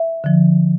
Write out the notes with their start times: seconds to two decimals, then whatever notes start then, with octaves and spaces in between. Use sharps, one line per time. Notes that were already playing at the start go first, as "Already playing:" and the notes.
Already playing: E5
0.24 D3 F3